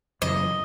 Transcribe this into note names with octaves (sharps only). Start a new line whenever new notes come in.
F#2 C#3 E3 D#5